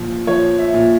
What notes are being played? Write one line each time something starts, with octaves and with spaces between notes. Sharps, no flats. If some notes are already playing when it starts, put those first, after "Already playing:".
Already playing: A#2 F3
F3 C#5
E5
A#2